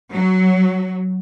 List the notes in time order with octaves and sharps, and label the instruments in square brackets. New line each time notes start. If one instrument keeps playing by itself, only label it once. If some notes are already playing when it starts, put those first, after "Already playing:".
[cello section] F#3